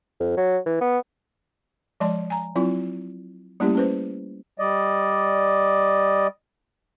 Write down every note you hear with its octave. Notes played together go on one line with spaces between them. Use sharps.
F2
F#3
E3
B3
F3 G#3 D5 A5 C6
G#5 A#5
F#3 C4 E4 F4
G3 A3 A#3 C#4 E4 G4
C#4 B4 C5
G3 D5 D#5